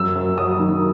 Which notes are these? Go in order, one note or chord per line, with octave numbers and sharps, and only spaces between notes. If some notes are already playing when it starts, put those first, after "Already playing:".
Already playing: F#2 E6
F#2
F#3 D#6
D#3